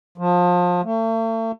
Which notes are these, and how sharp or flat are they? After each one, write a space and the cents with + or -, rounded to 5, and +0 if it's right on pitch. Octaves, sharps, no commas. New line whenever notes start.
F3 +25
A3 +40